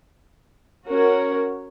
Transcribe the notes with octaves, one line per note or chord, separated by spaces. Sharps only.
C#4 F#4 A#4 C#5